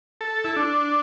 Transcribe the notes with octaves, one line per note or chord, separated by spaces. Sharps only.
A4
E4
D4